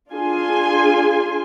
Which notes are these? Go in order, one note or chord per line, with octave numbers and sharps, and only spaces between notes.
D4 F4 G#4 G#5 C6